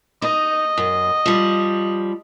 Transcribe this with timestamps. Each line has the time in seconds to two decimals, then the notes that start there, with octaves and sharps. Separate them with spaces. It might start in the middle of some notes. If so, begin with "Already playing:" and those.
0.22 D#4 D#5
0.78 F#2
1.26 F3 G3